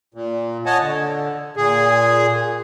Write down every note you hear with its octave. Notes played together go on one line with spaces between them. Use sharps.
A#2
C#5 D#5 F#5 G#5 A5
D3
A#2 G#4